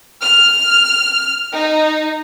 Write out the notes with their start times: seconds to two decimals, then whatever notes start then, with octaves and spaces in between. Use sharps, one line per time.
0.22 F6
1.54 D#4